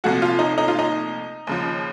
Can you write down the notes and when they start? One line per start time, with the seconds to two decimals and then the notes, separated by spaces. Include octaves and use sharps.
0.04 C2 A#2 F3 A3 F#4
0.22 F4
0.39 D#4
0.58 D#4
0.68 F4
0.79 D#4
1.47 D#2 C#3 F3